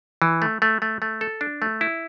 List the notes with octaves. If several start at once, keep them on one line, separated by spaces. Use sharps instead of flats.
E3
A3
A3
A3
A3
A4
D4
A3
E4